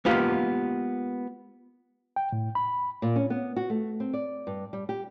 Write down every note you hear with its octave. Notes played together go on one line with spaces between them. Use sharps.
G#3 A#3 B3 F4 G4
G5
A2
B5
A#2
C#4
B3
F#4
A3
C4
D5
G2
G3
G4